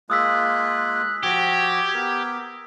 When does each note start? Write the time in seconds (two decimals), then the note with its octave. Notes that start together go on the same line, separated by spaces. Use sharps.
0.10 G#3 A#3 F4 D#6 E6 F#6 B6
1.23 F3 F#4 G4 G#6
1.94 B3 A#4